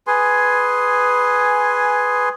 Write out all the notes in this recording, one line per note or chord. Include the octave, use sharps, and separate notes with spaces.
G#4 B4 G#5 C6